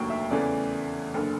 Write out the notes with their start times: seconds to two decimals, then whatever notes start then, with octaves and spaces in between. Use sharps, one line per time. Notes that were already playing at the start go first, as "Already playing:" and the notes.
Already playing: F1 D#2 D3 F#3 A#3 G5 C#6
0.10 E5
0.31 E2 C#3 E3 A3 D5
1.14 F#1 D3